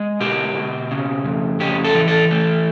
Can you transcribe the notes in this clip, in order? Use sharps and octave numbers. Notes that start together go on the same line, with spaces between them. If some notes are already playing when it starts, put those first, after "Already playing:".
Already playing: G#3
B2 G4
B2
C#3
F2
C#3 G4
A4
E3
A4
A3